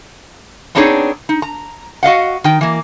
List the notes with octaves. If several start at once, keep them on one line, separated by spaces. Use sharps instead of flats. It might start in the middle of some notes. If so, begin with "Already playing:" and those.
B3 C4 D4 D#4 G#4 C#5
D#4
A#5
F#4 D#5 F5 F#5
D#3 G5
E3 A#3